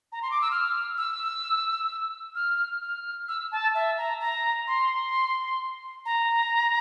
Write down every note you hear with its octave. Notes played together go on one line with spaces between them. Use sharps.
A#5
C6
D6
E6
F6
E6
F6
F6
E6
A5
E5
A#5
A#5
C6
A#5